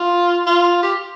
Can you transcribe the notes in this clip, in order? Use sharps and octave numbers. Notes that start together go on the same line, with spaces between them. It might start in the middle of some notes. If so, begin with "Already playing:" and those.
Already playing: F4
F4
G4